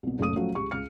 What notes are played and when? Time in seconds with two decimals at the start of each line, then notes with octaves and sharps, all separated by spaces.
0.03 C2 B2
0.19 F#1 A#2 C#3 A3 D#6 D#7
0.36 F3 F#3 A3 C#4 F#4
0.55 C#2 G4 C#6
0.71 C#2 F6 C#7